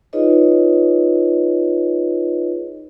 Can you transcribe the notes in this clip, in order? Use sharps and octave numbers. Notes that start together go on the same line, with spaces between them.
D#4 F4 G#4 B4 C#5 D#5